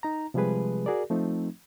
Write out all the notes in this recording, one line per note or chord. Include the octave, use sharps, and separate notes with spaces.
D#4 A#5
C3 F3 G3 G#3 G#4 B4
F#4 G#4 A#4 D5
F3 A3 C4 D#4